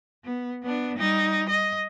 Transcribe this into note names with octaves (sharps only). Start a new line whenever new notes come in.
B3
B3 D4
G3 D#4
D#5